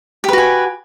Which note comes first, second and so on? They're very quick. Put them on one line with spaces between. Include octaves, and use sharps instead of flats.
G4 B4 F#4 G#5